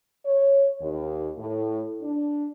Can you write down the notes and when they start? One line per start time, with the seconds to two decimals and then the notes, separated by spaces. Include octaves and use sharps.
0.25 C#5
0.81 D#2
1.37 A2
2.01 D4